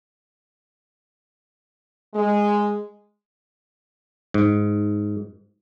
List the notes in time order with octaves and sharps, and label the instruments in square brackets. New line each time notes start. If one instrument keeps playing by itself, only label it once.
[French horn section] G#3
[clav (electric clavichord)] G#2